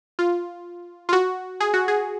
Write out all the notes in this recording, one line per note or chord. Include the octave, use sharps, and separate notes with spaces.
F4
F4
F#4
G#4
F#4
G#4